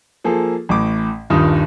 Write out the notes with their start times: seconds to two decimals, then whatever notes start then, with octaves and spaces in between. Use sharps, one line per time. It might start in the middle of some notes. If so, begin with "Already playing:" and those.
0.24 F3 A#3 G#4 A4
0.69 A1 A2 D6
1.30 D#1 G2 D#3 D#4 F4 D#6